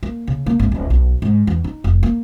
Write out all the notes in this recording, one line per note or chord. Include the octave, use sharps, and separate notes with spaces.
A#3
C#3
A#3
G#1
D1
B1
G#2
E2
D#4
F1
A#3